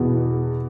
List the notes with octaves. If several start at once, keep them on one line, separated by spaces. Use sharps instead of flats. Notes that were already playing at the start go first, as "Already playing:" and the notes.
Already playing: E2 B2